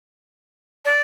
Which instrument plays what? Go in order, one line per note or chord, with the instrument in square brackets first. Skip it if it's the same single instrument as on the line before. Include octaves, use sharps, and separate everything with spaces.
[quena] D5